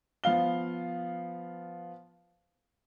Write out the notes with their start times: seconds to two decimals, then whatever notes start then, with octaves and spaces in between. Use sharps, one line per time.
0.24 F3 B3 F5 G7